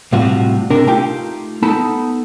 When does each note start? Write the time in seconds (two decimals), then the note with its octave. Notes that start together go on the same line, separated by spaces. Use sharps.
0.12 A2 C3 G3 F4 F#4
0.70 C3 D4 A#4
0.87 A3 D#4 F4 G4 G5
1.63 B3 D#4 A4 A5 B5